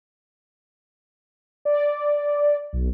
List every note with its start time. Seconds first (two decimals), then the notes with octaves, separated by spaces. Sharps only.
1.65 D5
2.73 B1